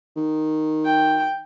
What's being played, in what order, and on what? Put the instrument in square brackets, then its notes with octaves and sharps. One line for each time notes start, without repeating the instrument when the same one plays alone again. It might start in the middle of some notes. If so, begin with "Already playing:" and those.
[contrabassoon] D#3
[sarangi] G5